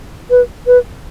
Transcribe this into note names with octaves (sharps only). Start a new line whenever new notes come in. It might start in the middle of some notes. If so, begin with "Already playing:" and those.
B4
B4